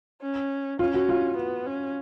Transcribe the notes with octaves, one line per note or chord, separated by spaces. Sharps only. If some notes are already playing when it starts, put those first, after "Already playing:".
C#4
C#4 F4
F#4
F4
B3
C#4